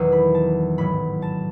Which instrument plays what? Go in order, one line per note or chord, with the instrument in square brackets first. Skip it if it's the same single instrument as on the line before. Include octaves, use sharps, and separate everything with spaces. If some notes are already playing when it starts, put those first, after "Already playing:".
Already playing: [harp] E1 E2 D#3 F#3
B5
A5
A1 G#2 F#3 B5
A5